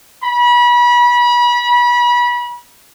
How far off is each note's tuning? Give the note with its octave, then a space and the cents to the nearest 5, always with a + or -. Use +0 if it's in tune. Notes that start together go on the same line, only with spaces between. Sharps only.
B5 -30